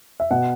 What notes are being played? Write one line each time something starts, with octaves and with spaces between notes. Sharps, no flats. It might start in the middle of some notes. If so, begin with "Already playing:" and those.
E5
B2 F#5